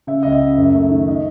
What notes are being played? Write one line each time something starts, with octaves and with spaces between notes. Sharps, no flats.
C#3 E5
C#2 D#5
E5
C#3
F#2
A3
D#3
D#5